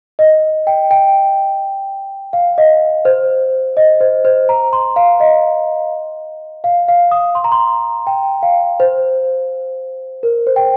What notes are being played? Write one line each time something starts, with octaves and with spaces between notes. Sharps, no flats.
D#5
G5
G5
F5
D#5
C5
D#5
C5
C5
A#5
C6
F5
D#5
F5
F5
D#6
C6
A#5
C6
G5
F5
C5
A#4
C5
G5